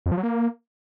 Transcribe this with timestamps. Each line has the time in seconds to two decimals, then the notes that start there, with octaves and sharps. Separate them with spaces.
0.06 F2
0.12 F3
0.17 F#3
0.23 A#3